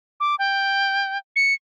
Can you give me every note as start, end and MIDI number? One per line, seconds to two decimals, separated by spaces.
0.20 0.35 86
0.39 1.18 79
1.36 1.54 97